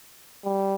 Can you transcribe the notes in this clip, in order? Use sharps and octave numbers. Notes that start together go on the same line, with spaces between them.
G3